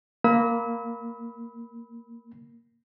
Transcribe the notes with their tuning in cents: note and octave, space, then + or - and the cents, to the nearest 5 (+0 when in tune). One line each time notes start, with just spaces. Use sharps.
A#3 +0 B5 +0 E6 -45